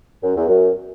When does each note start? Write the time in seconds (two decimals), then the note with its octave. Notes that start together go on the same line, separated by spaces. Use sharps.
0.23 F#2
0.36 E2
0.48 F#2